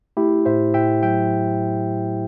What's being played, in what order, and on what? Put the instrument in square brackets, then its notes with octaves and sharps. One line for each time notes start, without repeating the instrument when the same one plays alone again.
[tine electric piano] A3 E4 G4
A2 C5 E5
A2 E5 G5
F#3 E5 G5